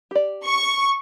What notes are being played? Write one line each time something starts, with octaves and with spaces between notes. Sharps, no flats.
G4 D5
C#6